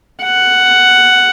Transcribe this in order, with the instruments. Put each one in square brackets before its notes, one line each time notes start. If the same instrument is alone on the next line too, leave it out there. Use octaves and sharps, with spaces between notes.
[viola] F#5